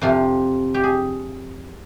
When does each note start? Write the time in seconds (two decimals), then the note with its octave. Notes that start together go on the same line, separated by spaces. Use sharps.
0.01 F2 C3 F3 F4
0.74 G4
0.84 G#4